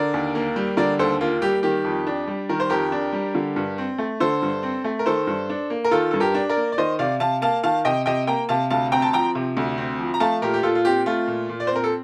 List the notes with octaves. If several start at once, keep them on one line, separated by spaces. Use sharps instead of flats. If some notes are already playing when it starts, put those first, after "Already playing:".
Already playing: D3 A#4 D5
D#2
A#3
G3
D3 A#4 D5
D#2 A4 C5
A#3 F4
G3 G4
D#3 G4
F2
D4
G3
D#3 A#4
C5
F2 G4 A#4
D4
G3
D3
G2
C4
A3
D3 A4 C5
G2
C4
A3
A#4
D#3 A4 C5
G2
D4
A#3
A#4
D#3 F4 A4
G2 A4
G4 A#4
D4
A#4 D5
A#3
D5
D#3 C5 D#5
C3 D5 F5
C3 F5 A5
A#3 F5 A5
D#3 F5 A5
C3 D#5 G5
C3 D#5 G5
A#3 G5 A#5
C3 F5 A5
D2 F5 A5
C4 G5 A#5
A5
F3 G5 A#5
C3
D2
C4
F3
A#5
A3 F5 A5
A#2 G4 A#4
G4
A#2 F4 A4
F4
C4 G4
A3 F4
A#2
A#2
D5
C5
C4 A#4
A4